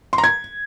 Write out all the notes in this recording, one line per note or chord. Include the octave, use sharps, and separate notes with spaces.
C6
A#5
G#6